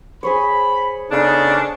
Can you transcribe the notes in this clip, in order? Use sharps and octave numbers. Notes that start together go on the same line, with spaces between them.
G#4 C5 C#5 B5
C#3 B3 D4 D#4 A4